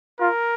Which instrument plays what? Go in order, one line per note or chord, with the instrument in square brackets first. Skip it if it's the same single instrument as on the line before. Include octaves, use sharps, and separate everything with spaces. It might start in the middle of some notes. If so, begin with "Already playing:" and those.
[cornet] F4 [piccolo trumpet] A#4